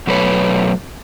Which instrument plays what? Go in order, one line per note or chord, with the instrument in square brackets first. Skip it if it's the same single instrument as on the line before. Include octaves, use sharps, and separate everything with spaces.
[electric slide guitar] B2 F#3 A3 B4 C#5